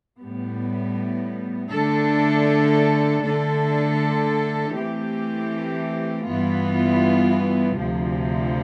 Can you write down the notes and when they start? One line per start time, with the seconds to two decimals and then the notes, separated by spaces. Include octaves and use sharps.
0.20 A2 G3 B3
1.71 D3 A3 D4 A4
3.23 D3 A3 D4 A4
4.74 E3 A3 C4 G4
6.25 G2 E3 B3 F4
7.77 D2 C3 F3